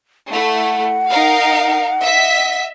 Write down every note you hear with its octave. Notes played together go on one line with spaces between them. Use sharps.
A3 E4 F#5
D#4 A#4 F5
D#5 E5 B6